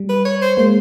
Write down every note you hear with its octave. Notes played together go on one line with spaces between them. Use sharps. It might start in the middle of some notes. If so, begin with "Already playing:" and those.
Already playing: G3
B4
C#5
C5
G#3 A#3 C5